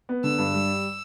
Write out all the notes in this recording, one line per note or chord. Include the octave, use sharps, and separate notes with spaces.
B3
D3 E6
G2
G3